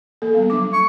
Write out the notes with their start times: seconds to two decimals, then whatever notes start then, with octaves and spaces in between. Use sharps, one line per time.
0.22 A#3 A4
0.34 G3 B3 F5
0.50 F#3 D4 D6
0.73 C#6